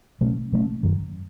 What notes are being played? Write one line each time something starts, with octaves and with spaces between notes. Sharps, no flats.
B2 F#3 A3 C#4
B2 F#3 A3 C#4
F#2 D#3 F#3